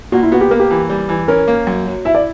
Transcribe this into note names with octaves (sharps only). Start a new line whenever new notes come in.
A#2 F#4
E4
B3 F#4
G4
A#3 A#4
G4
E3
G3
E3
C#4 A#4
A#3
F#2
F#3
E4 E5
D5